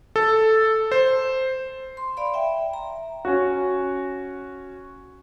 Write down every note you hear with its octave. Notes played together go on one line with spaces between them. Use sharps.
A4
C5
C6
D5 F5 B5 C6
E5 G5
A#5
C#4 F#4